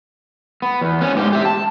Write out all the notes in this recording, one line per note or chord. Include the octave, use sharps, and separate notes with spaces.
B3
E2
B3 C#4
G#2 G4
G4 E5
A5